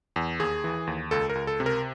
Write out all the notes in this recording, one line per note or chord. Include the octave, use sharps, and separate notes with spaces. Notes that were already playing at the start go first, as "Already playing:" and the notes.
E2
D#2 G#4
E3
D#2
C#2 A4
A#4
C#2
A4
C3
A#4